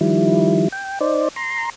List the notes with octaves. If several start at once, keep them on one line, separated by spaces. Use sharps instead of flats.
D#3 F3 G3 E4
G5
D#4 C5 D5
A#5 C6